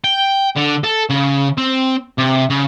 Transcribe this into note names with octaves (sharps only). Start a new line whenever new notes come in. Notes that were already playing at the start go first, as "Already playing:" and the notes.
G5
D3
A4
C#3
C4
C3
C#3